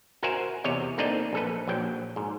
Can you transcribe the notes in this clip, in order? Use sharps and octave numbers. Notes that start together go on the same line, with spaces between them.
F#4 A#4 C5 E5 F#5 G#5
E2 C3 C#5 D#5
A3 A#3 C4 D4 D#4 D#5
A#1 A4 B4
A#1 F#3 G5
G#2